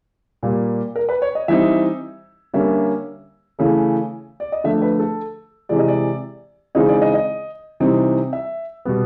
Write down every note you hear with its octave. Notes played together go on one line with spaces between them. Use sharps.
A#2 G3 A#3
A#4
B4
C#5
D#5
E3 G3 C4 D#4 E5
D3 G3 A#3 C#4 E5
C#3 E3 A3
D5
D#5
D3 F3 A3 E5
B4
A4
C3 E3 G#3 D5
D#5
D5
C#3 E3 G#3 C4 D#4 D#5
D5
D#5
D#5
C3 E3 G3 C4 D#4
E5
B2 G3 B3